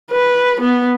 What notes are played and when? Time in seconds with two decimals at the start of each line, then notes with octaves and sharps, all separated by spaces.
0.12 B4
0.61 B3